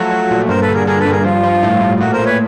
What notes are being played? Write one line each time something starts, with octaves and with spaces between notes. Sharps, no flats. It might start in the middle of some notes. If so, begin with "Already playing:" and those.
Already playing: F3 F#3 A3 F#4
F#3
A#2
G2 A#4 C5
A4 B4
D3
G#4 A#4
D3 G#4 A#4
A4 B4
G2
G#4 A#4
F3 F4
F3
A2
A2
A#2 F#4
A#4 C5
A#2
B4 C#5